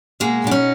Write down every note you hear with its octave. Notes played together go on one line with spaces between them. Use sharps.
B2 G#3 A#3
B2 D4
C#4 D#4